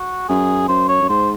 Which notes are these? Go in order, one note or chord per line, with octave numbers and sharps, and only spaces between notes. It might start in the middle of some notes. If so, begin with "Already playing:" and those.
Already playing: F#4
F#2 G#4
F#2 C5
C#5
F#2
G#2 C5